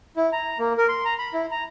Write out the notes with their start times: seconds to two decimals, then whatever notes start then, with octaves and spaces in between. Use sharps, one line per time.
0.16 E4
0.33 A#5
0.59 A#3
0.78 A#4
0.89 C6
1.05 A#5
1.19 B5
1.33 E4
1.51 A#5